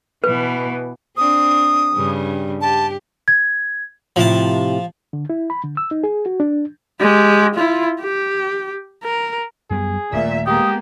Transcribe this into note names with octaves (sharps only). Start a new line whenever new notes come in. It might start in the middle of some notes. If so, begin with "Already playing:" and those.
B2 E3 B4
C4 D4 D#6
G2 C#3 G3
G4 A5
G#6
A2 C3 F3 E4 A5
D3
E4
B5
D3
E6
D#4
G#4
F#4
D4
G#3 G4
E4 F4
G4
A#4
F#2 G3 B3 G#4
D#1 A#2 A3 E5
G#3 A#3 B3 G4 D#6